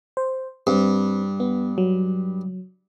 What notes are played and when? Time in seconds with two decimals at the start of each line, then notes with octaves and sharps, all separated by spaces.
0.17 C5
0.67 G2 C4
1.40 B3
1.78 F#3